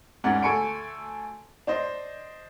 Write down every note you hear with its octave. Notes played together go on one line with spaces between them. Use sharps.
E1 G#2 C#4 D4 D5 F#5
D2 A4 G#5 C#6 C#7 D7
D4 C5 D#5